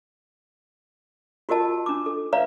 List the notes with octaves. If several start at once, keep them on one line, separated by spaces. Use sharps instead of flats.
F4 F#4 A#4 D#5 A5
D4 D6
A4
B4 C#5 D5 E5 F5 A#5